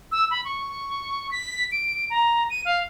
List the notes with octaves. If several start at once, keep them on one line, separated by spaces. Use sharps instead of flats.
E6
B5
C#6
B6
D7
A#5
D#7
F5